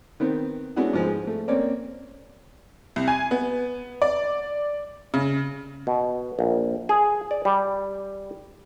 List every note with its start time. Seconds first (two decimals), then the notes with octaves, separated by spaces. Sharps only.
0.20 D#3 B3 C4
0.76 G#3 B3 C#4 D4 E4 F#4
0.93 G#2 F3 G#3
1.27 A3
1.48 A#3 C4 C#4 C#5 D5
2.96 C2
3.08 G#5
3.31 B3
4.02 D5
5.14 C#3
5.87 B2
6.39 A#1
6.89 G#4
7.31 D5
7.45 G3